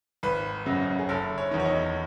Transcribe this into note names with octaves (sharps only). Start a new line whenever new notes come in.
G#1 B4
F#2 C#3 F#3
G#4
F#1 A4
C#5
E2 D#3
C#5
D#5